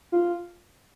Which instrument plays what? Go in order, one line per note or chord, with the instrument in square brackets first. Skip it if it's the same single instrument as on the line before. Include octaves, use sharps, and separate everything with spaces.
[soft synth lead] F4